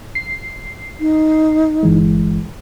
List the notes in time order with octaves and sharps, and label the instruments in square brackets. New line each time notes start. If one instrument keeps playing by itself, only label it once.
[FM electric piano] C7
[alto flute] D#4
[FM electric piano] G1 E3 G#3